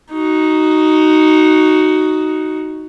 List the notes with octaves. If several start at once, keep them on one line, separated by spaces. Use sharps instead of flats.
D#4 F#4